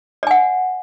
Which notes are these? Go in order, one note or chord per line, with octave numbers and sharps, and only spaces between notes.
D5 F#5 G#5